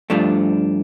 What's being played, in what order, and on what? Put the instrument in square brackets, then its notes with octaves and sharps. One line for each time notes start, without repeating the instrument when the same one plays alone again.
[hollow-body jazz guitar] G2 F3 A3 D4